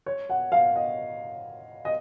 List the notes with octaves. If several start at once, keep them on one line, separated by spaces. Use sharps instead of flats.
C#5
F#5
F5
D#5
D#5